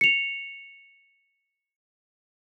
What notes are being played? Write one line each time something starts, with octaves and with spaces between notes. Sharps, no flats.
C#7 F7